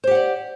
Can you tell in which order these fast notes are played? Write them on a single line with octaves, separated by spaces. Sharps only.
C5 G4 F#5 D5